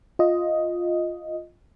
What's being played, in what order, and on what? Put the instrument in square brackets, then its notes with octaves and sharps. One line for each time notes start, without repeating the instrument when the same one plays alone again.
[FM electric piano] F4 D#5